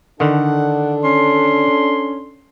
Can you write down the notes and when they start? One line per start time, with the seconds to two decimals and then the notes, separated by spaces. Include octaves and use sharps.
0.20 D3 D#3 D4 A4 F#5
1.04 C#4 C6